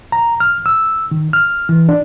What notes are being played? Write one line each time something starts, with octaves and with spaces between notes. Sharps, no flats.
A#5
F6
E6
D#3
F6
E3
D4